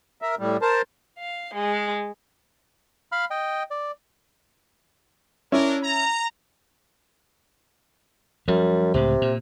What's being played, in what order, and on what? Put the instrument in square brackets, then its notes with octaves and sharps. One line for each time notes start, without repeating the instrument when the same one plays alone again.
[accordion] A#4 E5
A2 G3
A#4 C5 A5
[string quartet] F5
G#3
[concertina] F5 B5 F6
D#5 G5
D5
[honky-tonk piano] C#4 E4 [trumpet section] D4 A#4
[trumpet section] A#5
[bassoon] F#2 [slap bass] F3 G3
[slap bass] C#2 A2 [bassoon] C3
[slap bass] A#2